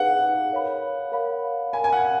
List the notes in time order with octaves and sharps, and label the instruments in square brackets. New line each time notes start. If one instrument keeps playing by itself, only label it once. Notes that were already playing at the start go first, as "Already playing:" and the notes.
Already playing: [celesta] D#4 G#4 B4 F5 [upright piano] F#5
[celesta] A#4 C#5 F5 B5
A#4 C#5 F5 B5
[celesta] A#4 F5 B5 [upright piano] G#5
[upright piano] G#5
F#5